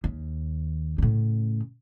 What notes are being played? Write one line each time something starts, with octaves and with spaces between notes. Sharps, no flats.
D#2
A2 C#3